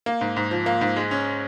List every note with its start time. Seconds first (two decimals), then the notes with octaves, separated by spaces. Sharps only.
0.06 A#3
0.21 G#2
0.37 G#2
0.51 F3
0.66 A#3
0.81 G#2
0.96 G#3
1.11 C#4